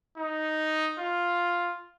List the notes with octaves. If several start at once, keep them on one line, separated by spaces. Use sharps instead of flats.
D#4
F4